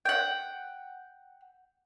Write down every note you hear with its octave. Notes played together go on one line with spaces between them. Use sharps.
F#5 G5